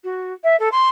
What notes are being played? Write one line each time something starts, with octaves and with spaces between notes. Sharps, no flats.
F#4
E5
A4
C6